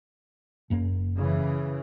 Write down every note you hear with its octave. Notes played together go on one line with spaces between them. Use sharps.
F#1 F#2 A#3
C#3 E3